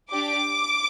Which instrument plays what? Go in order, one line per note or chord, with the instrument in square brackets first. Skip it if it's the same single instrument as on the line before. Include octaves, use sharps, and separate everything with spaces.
[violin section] D4 G4 D6